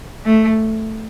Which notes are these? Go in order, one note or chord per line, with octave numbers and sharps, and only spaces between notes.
A3